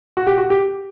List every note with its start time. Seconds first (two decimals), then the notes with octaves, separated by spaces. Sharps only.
0.17 F#4
0.27 G4
0.38 F#4
0.50 G4